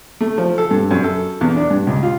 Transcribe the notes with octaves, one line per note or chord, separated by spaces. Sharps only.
A3
F3
A4
G2
F#2
A4
E2
D4
G2
C#2
F4